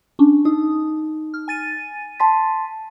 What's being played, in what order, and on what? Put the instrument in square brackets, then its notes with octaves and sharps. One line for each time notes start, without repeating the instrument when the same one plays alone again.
[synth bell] C#4 D4
[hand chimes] D#4 [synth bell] D#6
[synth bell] F6
G#5 A6 D#7
[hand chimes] A5 C6 B6